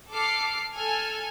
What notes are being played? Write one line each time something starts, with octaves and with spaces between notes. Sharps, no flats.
A4 D6 F6 C7
A4 G#5 F6